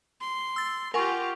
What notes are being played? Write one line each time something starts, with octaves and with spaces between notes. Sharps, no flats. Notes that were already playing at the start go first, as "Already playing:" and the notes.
C6
E6 A6
F4 G4 A#4 F#5 G#5 C#6